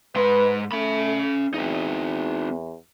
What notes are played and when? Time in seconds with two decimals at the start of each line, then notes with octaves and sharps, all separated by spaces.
0.16 G#2 B4 C6
0.72 A3 C#4 B5
1.54 E2 C4 D#4